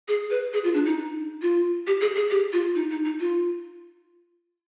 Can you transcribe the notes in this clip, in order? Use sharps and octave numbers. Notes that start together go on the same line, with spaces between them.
G#4
B4
G#4
F4
D4
D#4
F4
G4
G#4
G#4
G4
F4
D#4
D#4
D#4
F4